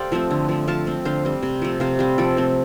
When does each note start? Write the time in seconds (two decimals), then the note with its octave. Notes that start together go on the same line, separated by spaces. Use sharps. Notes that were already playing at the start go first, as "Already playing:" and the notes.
Already playing: G4 A4 C5 D5 F5 G5
0.12 F3 A3 C4
0.31 D3
0.49 F3 A3
0.68 F3 F5 A5
0.87 C4
1.05 D3 C5 F5
1.25 G3 C4
1.43 C3
1.62 F3 A3
1.80 C3 C5 F5
1.99 G3 C4 C5 F5
2.18 F3 A4 D5
2.37 A3 C4